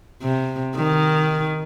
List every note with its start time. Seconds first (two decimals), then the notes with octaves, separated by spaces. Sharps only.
0.22 C3
0.76 D#3